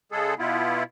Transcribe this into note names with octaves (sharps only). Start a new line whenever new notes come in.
C#3 G#3 G#4 A4
B2 B3 E4 F4